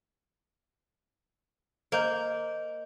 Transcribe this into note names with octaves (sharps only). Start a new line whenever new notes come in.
A#3 C5 D#5 G6